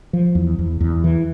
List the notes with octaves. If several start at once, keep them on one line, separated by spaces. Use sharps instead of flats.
F3
E2
E2
E2
E3